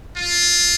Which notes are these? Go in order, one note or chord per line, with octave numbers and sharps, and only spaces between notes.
F4